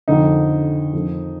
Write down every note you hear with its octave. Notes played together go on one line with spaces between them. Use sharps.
F2 D3 D#4
F2 D#3